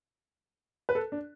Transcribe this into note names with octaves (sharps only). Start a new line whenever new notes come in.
B4
A4
D4